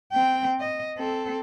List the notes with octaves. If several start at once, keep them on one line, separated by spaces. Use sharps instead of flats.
C4 G5
D#5
C4 A4